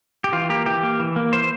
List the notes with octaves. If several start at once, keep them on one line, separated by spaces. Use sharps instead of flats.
G4
E3 F4
A#3 G4
E3 G4
A#3
E3
A#3
E3 C5